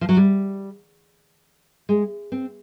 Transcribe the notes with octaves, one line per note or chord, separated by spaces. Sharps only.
F3
F#3
G3
G#3
C4